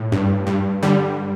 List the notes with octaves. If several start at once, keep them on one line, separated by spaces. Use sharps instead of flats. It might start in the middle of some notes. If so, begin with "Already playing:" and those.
Already playing: A2
G2
G2
D3 G3